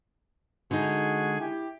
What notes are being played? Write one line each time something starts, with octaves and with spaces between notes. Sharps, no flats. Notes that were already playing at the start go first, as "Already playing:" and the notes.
D3 G#3 D#4 F#4 G#4
E4 G4